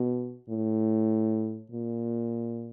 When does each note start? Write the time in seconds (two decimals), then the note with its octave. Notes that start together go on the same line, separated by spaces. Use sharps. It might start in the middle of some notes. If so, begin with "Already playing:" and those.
Already playing: B2
0.50 A2
1.72 A#2